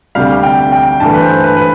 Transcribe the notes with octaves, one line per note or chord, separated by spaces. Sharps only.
D2 C3 G3 F5
G5
G5
G2 E3 A3 A5
B4
C5
B4
B4